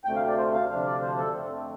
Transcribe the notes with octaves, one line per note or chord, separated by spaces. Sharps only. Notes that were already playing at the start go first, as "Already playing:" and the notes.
D2 C3 A3 G5
F5
D5
C5
F5
D2 C3 F3 D4 F5
D5
C5
A4
F2 D3 A3 C4